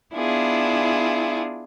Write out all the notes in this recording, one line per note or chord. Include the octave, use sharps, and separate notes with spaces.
B3 D4 E4 F4 G#4